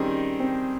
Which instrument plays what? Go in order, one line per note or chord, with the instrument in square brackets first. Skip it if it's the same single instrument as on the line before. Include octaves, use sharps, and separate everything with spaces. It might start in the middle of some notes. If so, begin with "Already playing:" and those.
Already playing: [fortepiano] D#3 G3 C4 D#4 G#4 [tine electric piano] C#4
[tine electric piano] C4